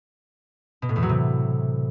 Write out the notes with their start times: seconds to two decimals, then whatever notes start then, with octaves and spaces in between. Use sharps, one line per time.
0.82 B2
0.89 A2
0.96 E2
1.02 F#3
1.09 C3